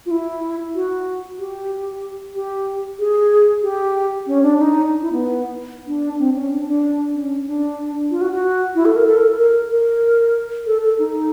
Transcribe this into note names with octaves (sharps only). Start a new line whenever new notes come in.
F4
E4
F#4
G4
G4
G#4
G4
C#4
D4
D#4
E4
B3
D4
C4
C#4
D4
D4
C#4
D4
F4
F#4
F#4
E4
A4
A#4
A4
A#4
A#4
A#4
A4
A4
D#4